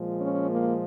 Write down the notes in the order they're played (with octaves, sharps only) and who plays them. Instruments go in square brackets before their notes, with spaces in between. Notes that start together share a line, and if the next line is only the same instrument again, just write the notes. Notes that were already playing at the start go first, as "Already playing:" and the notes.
Already playing: [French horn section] A#2 F3 G#3
C#4
A#3